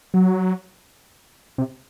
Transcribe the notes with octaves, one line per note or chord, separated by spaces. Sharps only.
F#3
C3